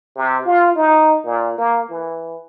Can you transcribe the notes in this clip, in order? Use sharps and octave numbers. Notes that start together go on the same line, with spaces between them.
C3
F4
D#4
A#2
A#3
E3